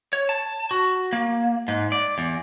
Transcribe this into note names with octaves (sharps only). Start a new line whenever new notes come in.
C#5
A5
F#4
A#3
G#2
D5
E2